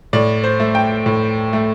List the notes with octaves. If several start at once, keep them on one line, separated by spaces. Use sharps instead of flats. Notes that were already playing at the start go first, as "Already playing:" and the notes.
A2 D5
C5
A3
G5
A2
A3